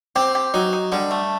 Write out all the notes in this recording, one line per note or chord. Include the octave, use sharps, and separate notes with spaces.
C4 G4
G4
F#3 D#4
D#4
D3 G3
A3